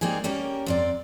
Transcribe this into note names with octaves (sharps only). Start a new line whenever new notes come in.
G3 A#3 C4 D#4 G#4
G3 A#3 C#4 G4 A#4
F2 C4 D5